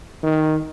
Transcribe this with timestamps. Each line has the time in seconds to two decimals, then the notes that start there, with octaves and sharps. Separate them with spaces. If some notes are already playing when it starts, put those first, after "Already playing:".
0.24 D#3